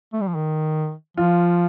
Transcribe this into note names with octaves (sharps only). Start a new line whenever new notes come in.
A3
G3
F3
D#3
F3 F4